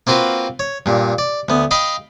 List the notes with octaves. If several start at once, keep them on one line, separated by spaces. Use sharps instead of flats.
A#3 C4 F4 F#4 B4
C#5
G2 A#2
D5
D2 B3
D#5 F5 G5 B5